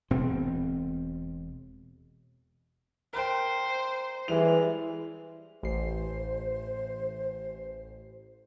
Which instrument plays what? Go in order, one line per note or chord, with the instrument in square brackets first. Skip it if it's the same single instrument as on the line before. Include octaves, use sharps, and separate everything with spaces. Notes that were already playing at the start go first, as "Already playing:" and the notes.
[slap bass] E1 B2 C4
[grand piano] A#4 G5 [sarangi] C5
[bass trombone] E3 [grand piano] G3 G#3 F7
[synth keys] A1 C7 [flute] C5